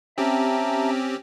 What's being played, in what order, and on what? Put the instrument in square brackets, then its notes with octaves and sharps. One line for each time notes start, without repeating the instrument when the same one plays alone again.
[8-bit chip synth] C4 C#4 G4 [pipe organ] E5 A5 A#5